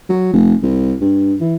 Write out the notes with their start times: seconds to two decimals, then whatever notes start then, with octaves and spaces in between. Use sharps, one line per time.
0.09 F#3
0.33 F1
0.62 C2
1.01 G2
1.40 E3